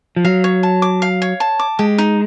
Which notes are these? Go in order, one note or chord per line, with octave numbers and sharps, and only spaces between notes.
F3
F#3 F5
C#5
A5
D6
F5
C#5
A5
D6
G#3 G4
D#4